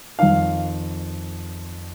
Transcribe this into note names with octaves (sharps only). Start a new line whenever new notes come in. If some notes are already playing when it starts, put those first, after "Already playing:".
F2 D#3 F5